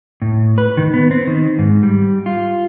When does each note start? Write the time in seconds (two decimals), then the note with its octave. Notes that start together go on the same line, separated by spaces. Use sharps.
0.22 A2
0.58 B4
0.77 D#3
0.94 B3
1.11 C4
1.27 D#3
1.59 G#2
1.83 G3
2.26 F4